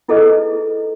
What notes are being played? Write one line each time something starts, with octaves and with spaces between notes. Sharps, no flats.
D#4 E4 G#4 A4 B4 D#5